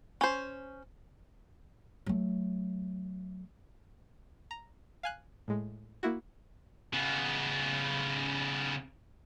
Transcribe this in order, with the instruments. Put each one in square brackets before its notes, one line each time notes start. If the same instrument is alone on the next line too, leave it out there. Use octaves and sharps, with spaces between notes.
[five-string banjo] C#4 C5
[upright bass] F#3 A3
[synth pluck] A#5
F5 G#5 F#6
A2 G#3
A#3 E4 F#4
[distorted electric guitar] C#3 B3